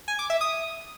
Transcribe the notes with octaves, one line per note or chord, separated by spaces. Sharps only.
G#5
D6
E5
D#6